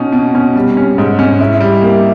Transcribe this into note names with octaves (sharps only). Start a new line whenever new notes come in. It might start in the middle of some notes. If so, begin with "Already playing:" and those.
Already playing: B2 C#4 D#4
B2
C#4
G3
C#4
G#2
C#4
E4
G3
A#3